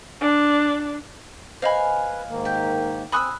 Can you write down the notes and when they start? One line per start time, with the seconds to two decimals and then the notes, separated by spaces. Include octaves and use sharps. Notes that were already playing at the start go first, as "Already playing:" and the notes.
0.21 D4
1.62 B4 C5 D#5 F5 G#5 B5
2.29 G#2 D#3 A#3
2.45 G4
3.12 C4 G#5 B5 C#6 D#6 E6 F#6